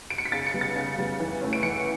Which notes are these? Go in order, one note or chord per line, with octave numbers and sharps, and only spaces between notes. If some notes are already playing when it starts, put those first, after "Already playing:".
D7
C#7
B6
C#3 A6
C#7
G3 B3
A6
C#3 C#7
G3 B3
E3
A3 C#4
D7
E3 C#7